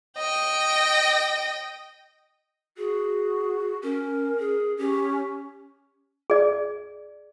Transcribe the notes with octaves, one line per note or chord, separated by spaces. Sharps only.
D#5 G5
F#4 G#4
C#4 A#4
G#4
C#4 G4
G#4 D5